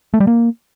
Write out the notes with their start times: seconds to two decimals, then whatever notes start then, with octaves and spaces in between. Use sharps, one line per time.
0.14 A3
0.20 G3
0.27 A#3